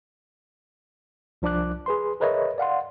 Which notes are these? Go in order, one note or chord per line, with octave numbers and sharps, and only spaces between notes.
C2 F3 D4 D5 D6 F#6
G#4 B4 C6
G#4 A#4 B4 C#5 D#5 E5
D5 F5 F#5 C6